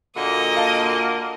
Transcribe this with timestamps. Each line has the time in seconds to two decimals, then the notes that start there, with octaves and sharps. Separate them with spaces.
0.17 A#2 D3 A#3 F#4 D#5
0.57 F5 A5